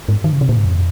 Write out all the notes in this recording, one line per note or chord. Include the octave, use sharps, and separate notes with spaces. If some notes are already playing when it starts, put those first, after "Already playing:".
G#2
D#3
C#3
C3
A#2
G#2
F2